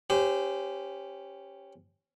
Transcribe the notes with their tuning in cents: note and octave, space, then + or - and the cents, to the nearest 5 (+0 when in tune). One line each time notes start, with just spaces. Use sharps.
C#4 +0 G4 +5 C5 -30